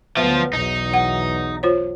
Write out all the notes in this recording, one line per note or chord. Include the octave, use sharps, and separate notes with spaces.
D2 F3 F#3 B3 E5
B1 E2 F#3 D#4
F#5
F4 C5 C#5